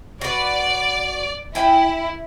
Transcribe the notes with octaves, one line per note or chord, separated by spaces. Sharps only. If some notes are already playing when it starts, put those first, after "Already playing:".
F#4 B4 D5
E4 G5 G#5